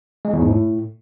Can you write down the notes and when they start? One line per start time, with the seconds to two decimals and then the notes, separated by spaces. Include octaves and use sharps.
0.25 G#3
0.33 E2
0.42 G#2
0.50 A2